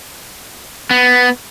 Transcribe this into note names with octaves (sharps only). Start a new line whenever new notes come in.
B3